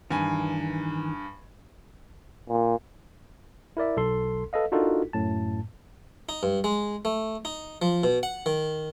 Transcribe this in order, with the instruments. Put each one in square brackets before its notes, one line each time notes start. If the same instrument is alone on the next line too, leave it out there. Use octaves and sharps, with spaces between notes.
[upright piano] G2 G#5 [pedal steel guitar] D#3 E3
[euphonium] A#2
[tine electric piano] E4 A#4 D5 E5
B1 A4 C6
A4 B4 D#5 F5
D4 D#4 F4 F#4 A4 A#4
F#2 A2 A5
[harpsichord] D#4
G2
G#3
A3
D#4
F3
B2
F#5
D#3